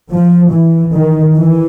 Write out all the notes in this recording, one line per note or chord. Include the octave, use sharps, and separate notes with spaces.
F3
E3
D#3
E3